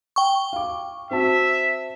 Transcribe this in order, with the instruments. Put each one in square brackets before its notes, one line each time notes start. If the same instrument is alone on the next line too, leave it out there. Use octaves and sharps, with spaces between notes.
[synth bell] G5 C#6
[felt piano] F5 D6
[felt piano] C4 F#4 A5 [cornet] E5